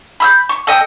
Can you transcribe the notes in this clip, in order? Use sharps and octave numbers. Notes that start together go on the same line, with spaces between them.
B5 E6 G6
C#6
A4 D#5 G5